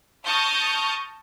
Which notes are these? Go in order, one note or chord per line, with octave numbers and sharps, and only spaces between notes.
A5 C#6 D#6 F6 G6 A#6